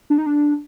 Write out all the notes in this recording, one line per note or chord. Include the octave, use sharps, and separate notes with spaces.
D4
D#4
D4